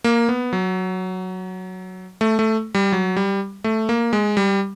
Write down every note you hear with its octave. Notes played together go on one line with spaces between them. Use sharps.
A#3
B3
F#3
A3
A3
G3
F#3
G3
A3
A#3
G#3
G3